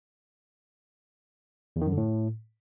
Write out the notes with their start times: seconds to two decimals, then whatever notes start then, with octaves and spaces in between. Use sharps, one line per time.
1.76 E2
1.81 D#3
1.87 F#2
1.92 D3
1.97 A2